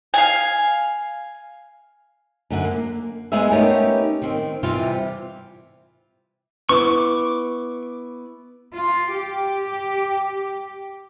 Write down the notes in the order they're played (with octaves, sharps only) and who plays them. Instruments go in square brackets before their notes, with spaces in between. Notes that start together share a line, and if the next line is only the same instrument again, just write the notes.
[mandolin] F5 G#5
[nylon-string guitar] F#2 D3 F#5
A#3
G#3 B3 D#4 G#4 C5 E5
A3 B3 C#4 D#4 G4 A#4
D#3 C4
C3 E3 G3 C4 F4
[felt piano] B3 E4 [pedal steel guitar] C#6 D6
[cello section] F4
G4